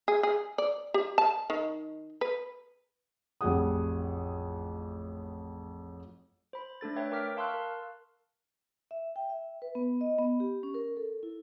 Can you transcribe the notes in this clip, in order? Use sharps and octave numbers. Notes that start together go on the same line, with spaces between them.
G#4
G#4
D5
G4
A5
D#3
B4
A1 F2 G3 G#4 F#5 D#6
C5 B5
A3 D4 A4 A6
B4 C#5 E5 G5
A#4 G5 D6 F6 B6
F5 A5 C6 C#6 E6 F#6
A#4
E5
G5
E5
B4
B3
D#5
B3
G4
C#4
A#4
A4
E4